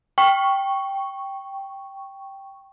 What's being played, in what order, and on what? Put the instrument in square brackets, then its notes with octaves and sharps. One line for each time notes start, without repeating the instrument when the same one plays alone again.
[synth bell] G5 C#6